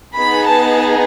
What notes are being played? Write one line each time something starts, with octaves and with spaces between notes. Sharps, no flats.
B3 D#4 G#4 B5
A5